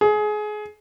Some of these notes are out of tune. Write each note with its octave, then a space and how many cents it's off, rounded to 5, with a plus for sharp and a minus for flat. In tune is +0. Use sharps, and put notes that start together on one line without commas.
G#4 +25